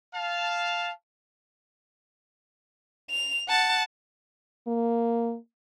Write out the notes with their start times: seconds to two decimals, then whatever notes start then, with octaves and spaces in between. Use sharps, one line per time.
0.14 F5 A5
3.10 F7
3.49 F#5 A5
4.67 A#3